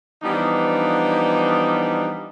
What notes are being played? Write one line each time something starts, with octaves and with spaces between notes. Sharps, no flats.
E3 F3 G3 B3 D4 D#4